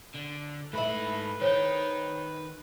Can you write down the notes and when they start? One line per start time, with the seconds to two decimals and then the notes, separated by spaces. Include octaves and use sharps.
0.14 D3
0.73 G#2 A3 E4 B4 B5
1.41 D#3 C5 C#5 G5